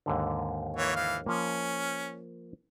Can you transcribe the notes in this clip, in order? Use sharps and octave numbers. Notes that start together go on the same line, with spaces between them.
D#2 G#2 D3
E3 A#3 C#5
E3 F5
F3 A#3 C#4